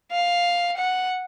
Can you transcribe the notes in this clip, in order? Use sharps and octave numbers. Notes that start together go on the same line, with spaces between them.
F5
F#5